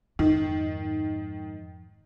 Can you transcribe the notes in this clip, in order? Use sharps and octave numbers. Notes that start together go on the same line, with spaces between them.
F2 G#2 D#3